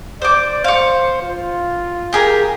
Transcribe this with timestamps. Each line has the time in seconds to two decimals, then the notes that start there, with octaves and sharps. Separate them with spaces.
0.22 C5 D5 D6
0.64 C5 F5 C#6
1.22 F4
2.13 G4 G#4 A#4